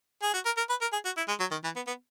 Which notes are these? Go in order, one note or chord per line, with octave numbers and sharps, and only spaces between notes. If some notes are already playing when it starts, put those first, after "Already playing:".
G#4
F#4
A#4
A#4
B4
A#4
G#4
F#4
E4
G#3
F#3
D#3
E3
B3
B3